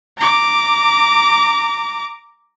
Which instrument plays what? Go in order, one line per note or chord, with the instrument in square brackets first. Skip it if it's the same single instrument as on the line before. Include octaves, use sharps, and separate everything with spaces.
[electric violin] A#5 D6